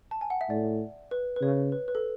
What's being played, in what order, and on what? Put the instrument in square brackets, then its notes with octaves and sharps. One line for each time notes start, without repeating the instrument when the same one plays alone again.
[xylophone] A5
G#5
F#5
E5
[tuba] A2 [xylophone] D5
[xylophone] B4
B4
[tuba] C#3 [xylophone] C#5
[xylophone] B4
B4
A4